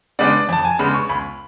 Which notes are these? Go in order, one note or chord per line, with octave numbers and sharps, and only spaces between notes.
C#3 G#3 B3 D4 D5
F2 A5
G#5
C#3 G#3 B3 D4 B5
C#6
C#2 B5